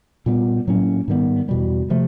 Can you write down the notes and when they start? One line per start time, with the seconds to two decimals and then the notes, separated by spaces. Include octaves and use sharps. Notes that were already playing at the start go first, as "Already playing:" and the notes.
0.26 A#2 G3 B3
0.68 A2 F#3 A#3 C#4
1.08 G#2 D#3 G3 B3
1.49 E2 B2 G3
1.90 C3 F3 A3